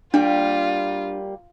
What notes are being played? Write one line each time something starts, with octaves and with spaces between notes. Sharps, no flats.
G3 A#3 D4 F4 G4